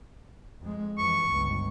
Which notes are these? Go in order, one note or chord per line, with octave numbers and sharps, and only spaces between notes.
F2 G#3
F2 E3 C#6
G1 C#2